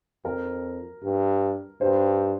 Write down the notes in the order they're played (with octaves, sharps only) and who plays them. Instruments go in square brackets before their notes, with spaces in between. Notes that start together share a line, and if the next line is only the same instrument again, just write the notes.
[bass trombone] F2 [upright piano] A#4
[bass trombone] G2
[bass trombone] G2 [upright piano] C5